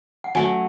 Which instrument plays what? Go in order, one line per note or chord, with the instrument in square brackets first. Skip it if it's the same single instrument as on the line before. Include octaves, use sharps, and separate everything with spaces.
[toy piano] F#5
[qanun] F#3 A3 C#4 [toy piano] G#5